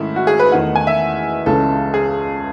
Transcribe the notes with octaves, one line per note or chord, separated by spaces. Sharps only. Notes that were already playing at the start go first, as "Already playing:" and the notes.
Already playing: G#2 D#3 A3 C#4 E4
F#4
G#4
B4
E2 D#3 A3 F#5
G#5
E5
C#2 C#3 E3 G#3 C#4 A4
G#4